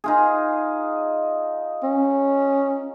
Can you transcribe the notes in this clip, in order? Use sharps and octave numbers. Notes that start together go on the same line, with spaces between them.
D#4 F4 G#4
C#4